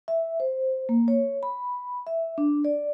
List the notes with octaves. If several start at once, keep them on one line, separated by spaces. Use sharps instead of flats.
E5
C5
A#3
C#5
B5
E5
D4
D5